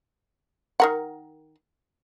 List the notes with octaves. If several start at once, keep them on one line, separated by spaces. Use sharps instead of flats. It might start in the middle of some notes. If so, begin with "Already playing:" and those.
D#3 A#4 F#5